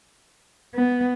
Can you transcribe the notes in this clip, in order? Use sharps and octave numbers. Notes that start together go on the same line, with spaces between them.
B3